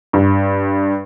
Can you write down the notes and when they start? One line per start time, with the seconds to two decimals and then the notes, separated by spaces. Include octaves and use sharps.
0.13 G2